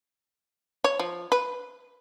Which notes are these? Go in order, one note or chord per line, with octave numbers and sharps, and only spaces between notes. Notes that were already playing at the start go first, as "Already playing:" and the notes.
C#5
F3
B4